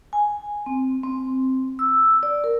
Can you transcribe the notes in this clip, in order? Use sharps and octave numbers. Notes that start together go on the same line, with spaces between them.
G#5
C4
C4
E6
D5
A#4